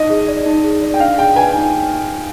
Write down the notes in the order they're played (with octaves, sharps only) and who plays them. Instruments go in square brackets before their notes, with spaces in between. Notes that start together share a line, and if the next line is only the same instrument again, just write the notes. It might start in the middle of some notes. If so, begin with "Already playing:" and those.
Already playing: [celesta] D#4 [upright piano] D#5
[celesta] G#4
D5
D#4
G#4
D5
[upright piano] G5
[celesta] D4 [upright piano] F5
[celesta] G#4 [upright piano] G5
[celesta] B4 [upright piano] G#5
[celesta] D#4